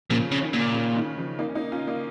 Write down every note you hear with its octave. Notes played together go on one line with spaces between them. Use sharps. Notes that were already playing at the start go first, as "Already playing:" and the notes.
A#2 C#3 F3
C#3
D#3
A#2
C#3
D#3
C#3 F3
A#3 D#4
C#4
A#3 D#4
C#4 F4
A#3 D#4